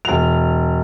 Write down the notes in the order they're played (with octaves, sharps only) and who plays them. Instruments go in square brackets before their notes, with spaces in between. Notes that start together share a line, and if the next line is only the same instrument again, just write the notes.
[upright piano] E1 F7